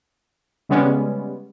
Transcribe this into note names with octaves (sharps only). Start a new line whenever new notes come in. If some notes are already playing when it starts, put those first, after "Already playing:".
C#3 G3 G#3 B3 C#4